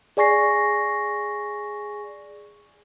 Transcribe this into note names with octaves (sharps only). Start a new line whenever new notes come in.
G#4 D5 G#5 C#6 A#6 C7